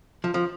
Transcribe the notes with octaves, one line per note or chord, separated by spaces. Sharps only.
F3
F3